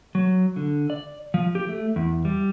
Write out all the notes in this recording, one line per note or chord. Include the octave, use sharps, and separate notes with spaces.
F#3
D3
D5
F3
G4
A3
E2
G3